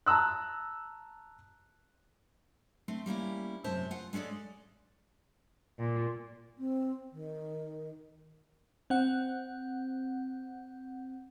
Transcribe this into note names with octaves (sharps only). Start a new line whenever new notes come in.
A5 A#5 E6 F#6
A3 C4 C5
G3 A#3 C#4 E4
F#2 C3 G#3 C5 E5 A5
F4 F#5
G#3 C#4 A4 D5 D#5
A#2
C4
D#3
C4 F#5